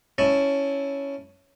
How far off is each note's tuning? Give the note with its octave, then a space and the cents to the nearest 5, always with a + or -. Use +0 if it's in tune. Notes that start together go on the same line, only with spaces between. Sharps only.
C#4 +5 E4 -5 A5 +5